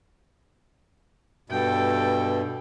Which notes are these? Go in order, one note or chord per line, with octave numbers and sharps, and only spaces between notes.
G2 B2 A4 G5